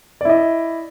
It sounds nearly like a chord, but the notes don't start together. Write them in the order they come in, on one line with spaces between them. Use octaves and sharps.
D5 E4 D#5